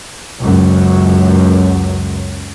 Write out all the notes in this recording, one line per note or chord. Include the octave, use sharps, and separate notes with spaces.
C#2 F#2